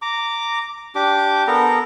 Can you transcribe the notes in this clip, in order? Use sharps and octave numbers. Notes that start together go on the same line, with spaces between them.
A#5 D6
D4 G4 D6
B3 A4 A#4 A#5